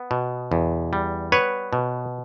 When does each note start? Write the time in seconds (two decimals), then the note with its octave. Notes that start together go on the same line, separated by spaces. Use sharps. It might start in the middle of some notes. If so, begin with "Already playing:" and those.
Already playing: B3
0.11 B2
0.52 E2
0.93 G3
1.32 B3 B4 C#5
1.73 B2